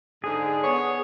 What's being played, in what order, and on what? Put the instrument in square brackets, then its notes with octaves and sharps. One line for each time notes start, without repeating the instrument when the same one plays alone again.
[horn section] G#2 D3 [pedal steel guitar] G#4
[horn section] B3 C#5